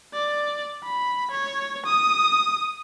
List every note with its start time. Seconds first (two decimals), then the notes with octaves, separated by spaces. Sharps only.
0.13 D5
0.84 B5
1.31 C#5
1.86 D#6